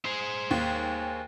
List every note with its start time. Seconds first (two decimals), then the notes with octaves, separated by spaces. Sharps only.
0.05 G#4 C5
0.51 D#2